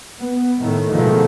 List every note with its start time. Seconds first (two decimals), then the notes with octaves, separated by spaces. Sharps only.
0.19 B3
0.60 A2 D#3 A3
0.92 B2 D3 D#3 F3 G#3 A3